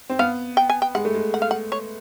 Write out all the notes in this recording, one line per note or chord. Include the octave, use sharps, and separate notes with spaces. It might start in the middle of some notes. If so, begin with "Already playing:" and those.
C4
B3 F5
G5
G#5
G5
G#3 F#5
A3
G#3
F#5
F5
F#5
C#5